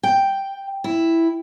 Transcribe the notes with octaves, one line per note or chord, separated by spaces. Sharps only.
G5
E4